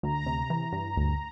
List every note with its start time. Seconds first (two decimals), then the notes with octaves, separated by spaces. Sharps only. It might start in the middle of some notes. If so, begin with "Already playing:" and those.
0.03 D2 A#5
0.26 C3
0.50 E3
0.73 G2
0.97 D2